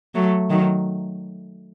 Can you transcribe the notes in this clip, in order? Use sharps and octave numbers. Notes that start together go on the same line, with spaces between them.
F#3 A3
D#3 F#3